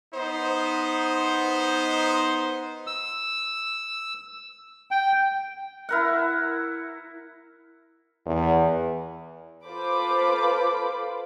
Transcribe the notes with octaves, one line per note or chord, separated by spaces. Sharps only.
B3 D#4 C5
E6
G5
E4 A#4 F#5
E2
F4 A4 B4 C5 B5 D6